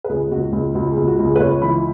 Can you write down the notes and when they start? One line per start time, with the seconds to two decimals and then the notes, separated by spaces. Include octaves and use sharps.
0.04 B4
0.09 C#2 G#4
0.31 C#2 F#4
0.52 C#2 G#4
0.75 C#2 F#4
0.91 G#4
0.97 C#2
1.07 F#4
1.19 C#2
1.25 G#4
1.36 B4
1.40 C#2 C#5
1.62 E3 B5